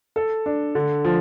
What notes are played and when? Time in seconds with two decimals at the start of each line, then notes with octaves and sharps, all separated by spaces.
0.16 A4
0.46 D4
0.75 D3
1.05 F3